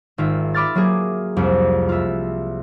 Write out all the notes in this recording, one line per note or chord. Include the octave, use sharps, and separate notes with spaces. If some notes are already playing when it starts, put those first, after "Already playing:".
G#1 F4 E5
E5 B5 D6 F6 A6
F#3 A#3 G#4
C2 F2
F4 E5